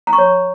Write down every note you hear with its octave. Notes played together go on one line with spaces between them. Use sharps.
A#5
C#6
C#5